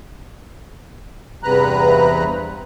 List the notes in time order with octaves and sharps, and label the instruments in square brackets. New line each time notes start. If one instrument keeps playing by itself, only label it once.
[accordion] E2 G2 C3 B4 A#5 F#6